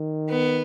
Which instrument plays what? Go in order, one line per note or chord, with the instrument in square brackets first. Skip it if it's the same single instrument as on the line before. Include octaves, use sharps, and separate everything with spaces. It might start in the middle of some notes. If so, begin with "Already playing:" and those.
Already playing: [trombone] D#3
[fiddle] B3